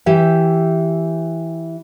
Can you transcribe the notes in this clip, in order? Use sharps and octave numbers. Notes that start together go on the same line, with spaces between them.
E3 G4 E5